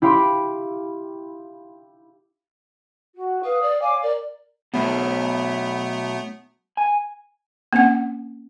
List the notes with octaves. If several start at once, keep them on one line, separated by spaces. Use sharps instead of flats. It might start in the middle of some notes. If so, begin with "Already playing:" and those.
E4 G4 F5 B5 C6 D6
F#4
B4 F5 D#6
D5
C#5 F5 G#5 D6
A#4 D5
B2 F#3 A3 B3 E4
G#5
A#3 C4 C#4 F#5